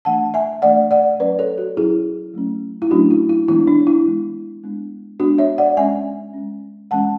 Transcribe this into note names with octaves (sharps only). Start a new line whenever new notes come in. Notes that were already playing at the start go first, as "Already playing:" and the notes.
E3 A3 D4 F#5 A5
E5 G#5
E3 A3 D4 D5 F#5
D5 F#5
F#3 C#4 B4 D5
A4 C#5
F#4 A4
F#3 C#4 E4 G#4
F#3 A3 C#4
E4
F#3 A3 C#4 D4 F#4
E4
E4
E3 G#3 B3 D4 E4
D4
D4
E4
E3 G#3 B3 D4
G#3 B3 D4
G#3 B3 D4 F#4
C#5 E5
D5 F#5
G#3 C#4 E5 G#5
G#3 C#4
E3 G#3 C#4 F#5 A5